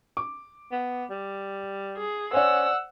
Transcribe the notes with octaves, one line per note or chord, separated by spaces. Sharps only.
D6
B3
G3
G#4
C#4 C5 D5 F#5 E6